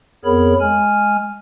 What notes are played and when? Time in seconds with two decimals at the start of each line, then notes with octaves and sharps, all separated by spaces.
0.25 F2 B3 G#4 A#4 C#5 B5
0.60 G#3 G#5 F6